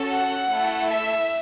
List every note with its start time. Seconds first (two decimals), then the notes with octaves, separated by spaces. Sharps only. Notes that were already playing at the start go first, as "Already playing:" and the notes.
Already playing: C#4 F#4 A4
0.11 F#5
0.50 A3 E4 A4
0.89 E5